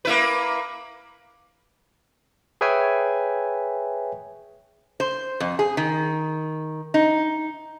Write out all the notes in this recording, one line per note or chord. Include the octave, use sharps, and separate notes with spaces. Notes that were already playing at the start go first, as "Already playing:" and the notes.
A#3 E4 B4
G#4 B4 C#5 E5 G5 G#5
C5
F2
G#4
D#3
D#4